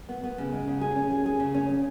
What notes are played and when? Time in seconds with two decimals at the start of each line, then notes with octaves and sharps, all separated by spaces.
0.09 B3
0.23 B3
0.38 C#3
0.53 G#3
0.67 C#3
0.81 G#4
0.96 C#4
1.11 G#4
1.26 G#4
1.40 C#3
1.55 C#4
1.69 C#4